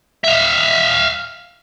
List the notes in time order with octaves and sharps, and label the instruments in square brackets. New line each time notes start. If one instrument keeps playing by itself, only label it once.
[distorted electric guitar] E5 F5